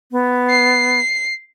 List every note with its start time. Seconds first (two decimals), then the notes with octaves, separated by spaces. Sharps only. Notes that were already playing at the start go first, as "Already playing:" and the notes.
0.12 B3
0.50 C7